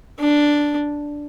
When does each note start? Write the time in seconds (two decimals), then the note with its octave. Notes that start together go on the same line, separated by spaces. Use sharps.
0.20 D4